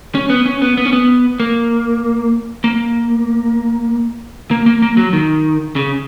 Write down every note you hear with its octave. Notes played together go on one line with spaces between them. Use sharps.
C#4
B3
C#4
B3
B3
C#4
B3
A#3
A#3
A#3
A#3
A#3
F#3
D#3
C#3